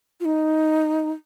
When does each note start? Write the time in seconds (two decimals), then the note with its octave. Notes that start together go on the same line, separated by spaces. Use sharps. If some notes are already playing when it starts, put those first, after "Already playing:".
0.20 F4
0.25 D#4